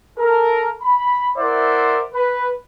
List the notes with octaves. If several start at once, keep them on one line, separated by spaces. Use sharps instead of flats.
A4 A#4
B5
E4 A#4 C5 D5 E5 F#5
B4